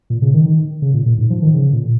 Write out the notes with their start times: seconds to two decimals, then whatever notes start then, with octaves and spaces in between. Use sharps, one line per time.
0.10 A#2
0.22 C#3
0.34 D#3
0.46 D#3
0.82 C#3
0.94 A#2
1.06 A#2
1.18 G#2
1.30 F3
1.42 D#3
1.54 C#3
1.73 A#2